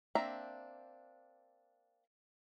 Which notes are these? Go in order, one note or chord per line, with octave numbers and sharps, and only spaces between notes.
A#3 C4 D4 E5 A#5